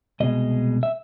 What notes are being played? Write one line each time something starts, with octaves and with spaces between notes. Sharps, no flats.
C2 B2 G#3 D#5
E5